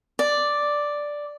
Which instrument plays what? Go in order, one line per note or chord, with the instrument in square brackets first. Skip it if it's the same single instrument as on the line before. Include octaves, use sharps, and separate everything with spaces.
[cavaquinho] D5